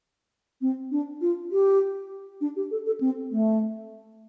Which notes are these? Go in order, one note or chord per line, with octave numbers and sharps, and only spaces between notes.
C4
D4
F4
G4
D4
G4
A4
A4
C4
A3